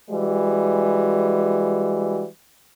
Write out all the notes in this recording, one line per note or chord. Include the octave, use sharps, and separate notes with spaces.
E3 G3 G#3 F#4